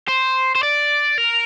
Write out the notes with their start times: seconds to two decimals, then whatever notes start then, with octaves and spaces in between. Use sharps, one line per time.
0.08 C5
0.55 C5
0.63 D5
1.18 A#4